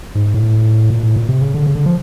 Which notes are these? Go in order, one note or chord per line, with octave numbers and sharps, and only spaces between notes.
G#2
A2
A#2
A2
A#2
C3
C#3
D3
C#3
D3
F3